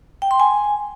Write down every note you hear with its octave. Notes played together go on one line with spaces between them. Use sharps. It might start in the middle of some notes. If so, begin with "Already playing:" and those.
G5
C6
G#5